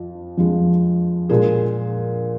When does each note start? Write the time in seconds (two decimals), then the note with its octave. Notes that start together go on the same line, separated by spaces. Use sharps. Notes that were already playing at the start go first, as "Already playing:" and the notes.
Already playing: F2 F3
0.38 F2 F3 G#3
1.29 A#2 G#3 G#4